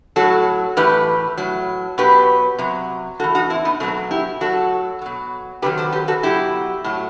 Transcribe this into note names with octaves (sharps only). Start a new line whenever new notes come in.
A2 F#3 F#4 A4
A2 E3 G4 B4
A2 F#3
B2 F#3 G4 B4
C3 F#3
A2 E3 F#4 A4
D#4 F#4
C4 E4
B3 D#4
B2 F#3 A3 C4
E4 G4
A2 F#3 F#4 A4
B2 F#3
C3 D#3 F#3 G4 B4
A4 C5
G4 B4
F#4 A4
B2 F#3 E4 G4
A2 F#3